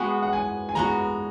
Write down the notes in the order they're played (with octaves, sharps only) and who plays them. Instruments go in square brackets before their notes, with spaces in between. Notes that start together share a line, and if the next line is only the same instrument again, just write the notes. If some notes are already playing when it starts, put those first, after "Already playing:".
Already playing: [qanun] G#3 B3 F#4 [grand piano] F#5
[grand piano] F#5
G#5
G#5
[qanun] G#3 B3 F#4 [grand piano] A#5